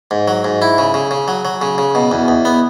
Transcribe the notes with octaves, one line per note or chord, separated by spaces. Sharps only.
G#2
F#3
G#2
E4
C#3
C#3
C#3
F#3
F#3
C#3
C#3
B2
E2
E2
B3